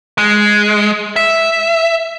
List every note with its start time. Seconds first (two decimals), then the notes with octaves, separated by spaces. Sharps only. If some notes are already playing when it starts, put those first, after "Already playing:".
0.18 G#3
1.16 E5